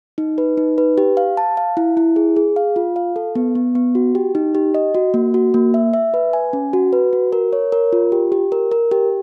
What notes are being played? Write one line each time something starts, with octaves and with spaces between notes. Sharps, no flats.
D#4
B4
D#4
B4
G4
F5
A5
F5
E4
E4
G#4
G#4
F5
F4
F5
A4
B3
B3
B3
F#4
G4
D#4
G4
D#5
F#4
A#3
F#4
A#3
E5
E5
B4
G#5
C#4
F#4
B4
F#4
A#4
C#5
A#4
F4
G4
G4
A#4
A#4
G4